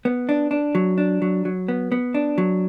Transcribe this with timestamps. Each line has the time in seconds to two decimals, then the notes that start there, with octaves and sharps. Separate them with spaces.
0.05 B3
0.29 D4
0.51 D4
0.75 F#3
0.98 D4
1.22 F#3
1.45 F#3
1.68 B3
1.92 B3
2.14 D4
2.38 F#3